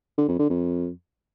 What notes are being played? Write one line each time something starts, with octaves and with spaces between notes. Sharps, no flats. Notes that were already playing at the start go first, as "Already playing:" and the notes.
D3
F2
D3
F2